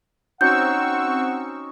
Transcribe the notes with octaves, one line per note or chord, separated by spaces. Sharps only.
C4 C#4 D#4 F#4 F#5 C#6 E6 G6